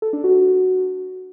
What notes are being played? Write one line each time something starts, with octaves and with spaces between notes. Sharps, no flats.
A4
D4
F#4
F#4